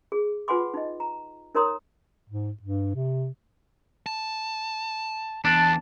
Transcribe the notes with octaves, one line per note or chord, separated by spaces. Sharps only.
G#4
F4 B4 F#5 G#5 C6 D6
D#4 D#5
A#5
D#4 A#4 C#5 A#5 C6 D#6
G#2
G2
C3
A5
E2 D4 A5